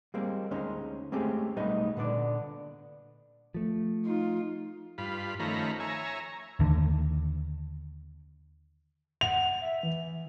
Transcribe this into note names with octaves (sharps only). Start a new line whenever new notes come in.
G3 G#3 A#3 C4
D2 G#3 C#4 D#4 C5
G#3 A3 C4 C#4 G4 G#4
B1 G3 A3 B3 D#4 D#5
A#2 D3 B3 D4 D5
F3 A3
D#4 F4
G2 F4 B5
D#3 F3 A3 C#4 A#5 B5
C#5 E5 G#5 A#5
D#2 D3
F#5 F7
E5
E3